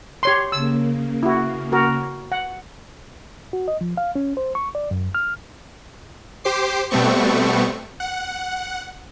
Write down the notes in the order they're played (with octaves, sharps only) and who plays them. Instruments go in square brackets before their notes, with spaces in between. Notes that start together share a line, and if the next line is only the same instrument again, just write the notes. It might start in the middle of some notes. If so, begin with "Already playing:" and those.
[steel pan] G4 C#5 C6
[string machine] C#3 A#3 [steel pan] E6
[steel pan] E4 F#4
F#4 A#4
F#5
[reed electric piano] F#4
D#5
F3
F5
C#4
C5
C#6
D5
F#2
F6
[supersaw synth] G4 C5 D6 C7
B2 G3 A3 B3 C4 C#6
F#5